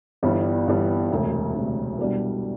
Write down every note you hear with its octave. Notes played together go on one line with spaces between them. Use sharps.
G1 G2 E3 G3 B3
G1 G2 E3 G3 B3
E1 D2 C3
E1 D2 C3
C2 B2 G3 D4